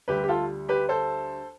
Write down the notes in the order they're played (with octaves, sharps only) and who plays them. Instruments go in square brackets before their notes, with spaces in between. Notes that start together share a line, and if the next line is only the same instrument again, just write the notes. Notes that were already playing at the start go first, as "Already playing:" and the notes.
[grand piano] D2 D3 G3 G4 B4
G4
F4 A4
G4 B4
A4 C5